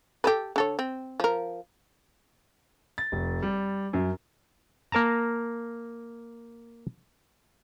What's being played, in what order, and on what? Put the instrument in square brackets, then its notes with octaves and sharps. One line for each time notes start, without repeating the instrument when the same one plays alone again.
[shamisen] G4 A4 B4
D3 A4 C#5
C4
F3 A#4
[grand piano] A6
F1
G3
F#2
[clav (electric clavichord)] A#3 A#4 A5 A#5